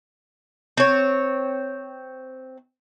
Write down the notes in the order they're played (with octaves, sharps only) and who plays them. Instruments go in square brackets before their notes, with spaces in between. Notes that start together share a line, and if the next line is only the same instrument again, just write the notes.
[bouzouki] C4 C#5